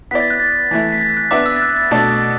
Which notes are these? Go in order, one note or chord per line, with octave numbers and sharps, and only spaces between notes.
B3 E4 D5 B6
A6
F#6
A6
E3 A3 E4
B6
A6
F#6
B3 D4 B4 E5 D6
E6
A6
F#6
A6
B2 A3 D4 A4 D5 A6